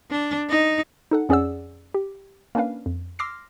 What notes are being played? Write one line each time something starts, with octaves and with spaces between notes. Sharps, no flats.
D4
D#4
D#4 A4 F#5
F2 C#4 G#4 D5 F#5 E6
G4
A#3 C#4 D4 B4 F5
F2
C6 D6 E6 F6 A#6 C7